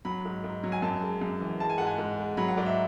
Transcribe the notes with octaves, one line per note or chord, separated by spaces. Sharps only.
F#3 B5
G#2
G#2
F#3
G#5
F#2 A5
G#3
F#2
E3
G#3 A5
G#5
G#2 F#5
G#5
G#2
G#3
F#3 B5
F#5
G#2 D5
E5